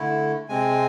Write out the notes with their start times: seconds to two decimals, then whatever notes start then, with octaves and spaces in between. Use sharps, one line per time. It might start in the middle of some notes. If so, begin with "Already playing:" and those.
Already playing: D3 A3 E4
0.49 C3 G#3 C4 G#5